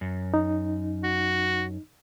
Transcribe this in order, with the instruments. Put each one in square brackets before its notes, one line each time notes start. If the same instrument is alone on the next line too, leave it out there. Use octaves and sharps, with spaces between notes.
[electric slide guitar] F#2
[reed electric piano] D#4
[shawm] F#4